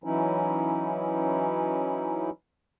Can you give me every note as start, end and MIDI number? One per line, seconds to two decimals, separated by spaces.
0.04 2.30 52
0.04 2.30 54
0.04 2.30 61
0.04 2.30 63
0.04 2.30 64